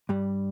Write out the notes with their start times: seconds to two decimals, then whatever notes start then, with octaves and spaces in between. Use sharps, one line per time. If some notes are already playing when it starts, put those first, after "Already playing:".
0.09 G2 G3